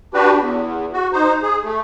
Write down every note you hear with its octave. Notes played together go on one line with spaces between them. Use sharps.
D4 F#4 G4 B4
E2
F#4
D#4 C5
G#4
A3